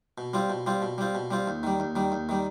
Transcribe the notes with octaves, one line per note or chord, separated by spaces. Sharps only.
B2
G3 C4 F4
B2
G3 C4 F4
B2
G3 C4 F4
B2
G3 C4 F4
D#2
D#3 G3
D#2
D#3 G3
D#2
D#3 G3